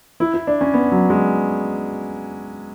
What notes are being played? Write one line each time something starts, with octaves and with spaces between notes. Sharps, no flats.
E4
E4
D4
C#4
B3
F#3
G#3